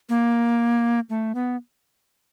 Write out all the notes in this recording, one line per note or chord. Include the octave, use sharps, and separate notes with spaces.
A#3
A3
B3